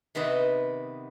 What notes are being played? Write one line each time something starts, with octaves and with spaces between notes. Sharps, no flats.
C3 D#3 B3 B4 D#5